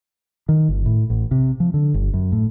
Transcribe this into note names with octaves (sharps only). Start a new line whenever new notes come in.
D#3
G1
A2
A1
C3
F3
D3
G1
F#2
A2